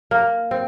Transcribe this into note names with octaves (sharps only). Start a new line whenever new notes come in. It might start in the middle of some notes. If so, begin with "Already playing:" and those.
A#3
C4